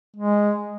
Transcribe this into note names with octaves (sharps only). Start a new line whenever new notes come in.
G#3